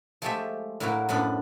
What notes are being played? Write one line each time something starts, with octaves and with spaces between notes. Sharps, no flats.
F3 G#3 A3 G4 A4 E5
A2 F#3 A#3 E4 F#4
F#2 A2 F3 B3 D4